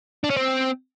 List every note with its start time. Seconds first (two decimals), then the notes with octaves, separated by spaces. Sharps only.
0.24 D4
0.30 C#4
0.37 C4